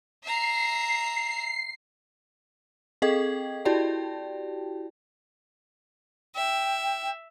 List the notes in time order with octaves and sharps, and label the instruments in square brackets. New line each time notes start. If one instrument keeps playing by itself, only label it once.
[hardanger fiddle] E5 A#5 [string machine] C7
[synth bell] C4 G#4 A4 D#5 G5 G#6
E4 F#4 G4 D5 G5 A5
[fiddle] E5 [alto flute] G5